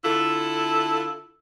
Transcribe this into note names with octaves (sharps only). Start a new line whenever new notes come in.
D3 E4 F4 A4